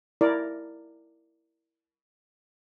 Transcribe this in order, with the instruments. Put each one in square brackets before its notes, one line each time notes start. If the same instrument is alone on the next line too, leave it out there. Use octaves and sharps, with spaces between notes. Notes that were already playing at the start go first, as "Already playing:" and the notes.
[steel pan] E4 A#4 D5